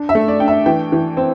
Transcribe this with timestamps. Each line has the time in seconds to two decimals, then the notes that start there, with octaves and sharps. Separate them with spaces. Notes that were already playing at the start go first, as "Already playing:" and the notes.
Already playing: D4
0.09 E5
0.15 A3
0.28 D5
0.40 D4 G5
0.48 E5
0.66 E3 G5
0.92 E3
1.17 C4